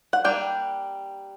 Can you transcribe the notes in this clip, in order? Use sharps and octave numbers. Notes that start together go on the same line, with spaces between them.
F#5
G3 A#3 D4 G5